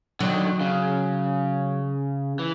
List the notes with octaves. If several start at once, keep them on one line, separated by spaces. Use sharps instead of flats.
D3 D#3 F#3
C#3
E3